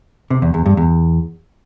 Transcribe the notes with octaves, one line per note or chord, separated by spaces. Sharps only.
C3
E2
E2
G2
E2